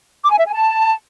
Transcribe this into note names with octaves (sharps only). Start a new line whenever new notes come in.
D6
G#5
E5
G#5
A5